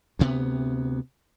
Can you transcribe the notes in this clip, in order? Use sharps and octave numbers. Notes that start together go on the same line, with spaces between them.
D2 C3 B3